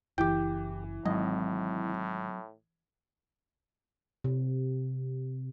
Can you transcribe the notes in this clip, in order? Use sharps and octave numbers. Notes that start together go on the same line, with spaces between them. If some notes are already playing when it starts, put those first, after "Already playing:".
F#1 E3 G4 G5
G#1 A2 F#3 C4 D#5
C3